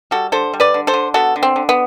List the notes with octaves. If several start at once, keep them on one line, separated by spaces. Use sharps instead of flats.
G3 F#4 A4
D3 A4 C5
G3
B4 D5
D3
A4 C5
D3
B3 F#4 A4
D3
C4
D3
B3